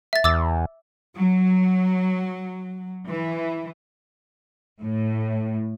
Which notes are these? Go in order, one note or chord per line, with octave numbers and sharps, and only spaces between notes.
E5 A6
E2 D6 E6 A6
F#3
E3
A2